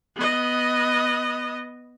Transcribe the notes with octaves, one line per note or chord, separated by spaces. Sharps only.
B3 D#5